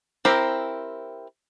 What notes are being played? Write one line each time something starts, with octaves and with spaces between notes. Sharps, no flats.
C4 E4 G4 A#4 C5